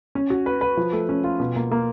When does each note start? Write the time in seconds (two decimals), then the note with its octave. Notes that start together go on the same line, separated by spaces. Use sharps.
0.15 C#4
0.30 F#4
0.46 B4
0.61 B4
0.77 F3
0.93 A3
1.09 C#4
1.24 F4
1.40 B2
1.56 A#3
1.71 A#3